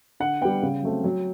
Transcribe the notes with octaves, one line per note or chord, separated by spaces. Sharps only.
D3 F#5
G3 B3 G5
C#3
F#3 A3 C4
F#3